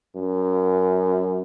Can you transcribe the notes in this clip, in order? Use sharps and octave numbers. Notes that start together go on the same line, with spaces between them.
F#2